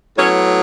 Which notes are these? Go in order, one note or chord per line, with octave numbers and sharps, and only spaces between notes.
A2 F#3 B3 C#4 C#5